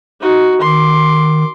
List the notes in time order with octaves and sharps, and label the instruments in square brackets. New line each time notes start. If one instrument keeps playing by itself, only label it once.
[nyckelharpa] D#4 F#4
[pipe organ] D#3 [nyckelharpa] C6 D6